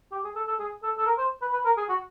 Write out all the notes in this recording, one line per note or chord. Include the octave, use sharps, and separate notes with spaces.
G4
G#4
A4
A4
G#4
A4
A4
A#4
C5
B4
B4
A#4
G#4
F#4